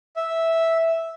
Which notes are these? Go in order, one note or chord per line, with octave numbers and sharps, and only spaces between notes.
E5